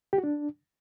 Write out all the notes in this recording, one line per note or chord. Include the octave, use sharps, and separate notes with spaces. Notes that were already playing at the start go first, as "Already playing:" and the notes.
G4
F#4
D4